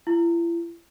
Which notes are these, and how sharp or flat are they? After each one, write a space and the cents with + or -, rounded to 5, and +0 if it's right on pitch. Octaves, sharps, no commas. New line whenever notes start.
E4 +40